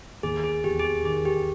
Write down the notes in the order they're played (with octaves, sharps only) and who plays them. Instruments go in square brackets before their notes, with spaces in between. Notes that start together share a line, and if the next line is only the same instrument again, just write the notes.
[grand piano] D#2 [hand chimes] G#4
[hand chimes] G#4
[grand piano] E1 [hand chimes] G4
[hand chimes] G#4
G4
[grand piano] D#3 [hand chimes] G#4
[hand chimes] G4